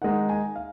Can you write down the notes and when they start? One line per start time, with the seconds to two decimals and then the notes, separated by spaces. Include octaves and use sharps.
0.02 D#3 G#3 D#4 F#5
0.29 G#5
0.56 F5